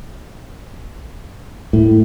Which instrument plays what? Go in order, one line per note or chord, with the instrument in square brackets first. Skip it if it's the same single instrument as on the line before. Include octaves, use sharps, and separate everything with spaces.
[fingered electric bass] A2